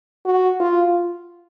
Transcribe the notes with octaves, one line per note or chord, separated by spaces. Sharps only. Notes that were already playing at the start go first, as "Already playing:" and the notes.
F#4
F4